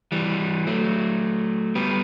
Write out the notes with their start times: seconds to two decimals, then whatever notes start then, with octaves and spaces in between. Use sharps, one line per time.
0.12 E3 G3
0.67 F#3 A3
1.75 G3 B3